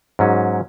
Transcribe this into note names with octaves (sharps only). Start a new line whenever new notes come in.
G#2 F#3 C#4